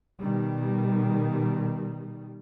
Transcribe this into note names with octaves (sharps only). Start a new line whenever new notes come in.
B2 D#3 G3